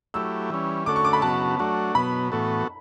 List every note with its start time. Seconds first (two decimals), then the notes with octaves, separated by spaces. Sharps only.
0.14 F#3 A3 E4 G4 E6
0.50 E3 G3 C#4
0.86 D3 A3 C#4 F#4 A4 D6
0.96 C#6
1.05 D6
1.13 B5
1.22 C#3 F#3 B3 F#4 A5
1.59 F#3 A3 D4 F#4
1.95 B2 F#3 B3 B5
2.32 A2 E3 B3 F#4 A4